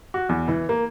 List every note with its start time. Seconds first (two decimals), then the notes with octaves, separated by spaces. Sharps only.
0.14 F#4
0.29 E2
0.48 E3
0.69 A#3